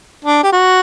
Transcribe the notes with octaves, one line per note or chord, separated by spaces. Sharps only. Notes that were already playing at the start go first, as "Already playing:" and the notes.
D4
G4
F#4